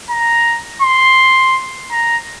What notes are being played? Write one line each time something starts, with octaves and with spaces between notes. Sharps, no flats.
A#5
C6
A#5